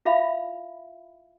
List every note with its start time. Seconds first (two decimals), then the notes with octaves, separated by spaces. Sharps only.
0.05 E4 F4 E5 F5 B5